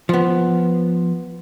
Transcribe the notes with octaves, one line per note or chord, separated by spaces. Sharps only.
F3 B3